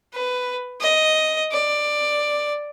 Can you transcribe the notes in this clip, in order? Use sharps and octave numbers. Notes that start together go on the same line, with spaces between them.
B4
D#5
D5